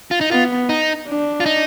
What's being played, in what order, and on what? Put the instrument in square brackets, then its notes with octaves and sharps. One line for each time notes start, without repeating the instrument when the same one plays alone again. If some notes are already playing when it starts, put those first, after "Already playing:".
[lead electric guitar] F4
D#4
[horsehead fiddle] B3 [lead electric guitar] F4
[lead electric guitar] D#4
[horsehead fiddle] D4
[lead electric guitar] F4
D#4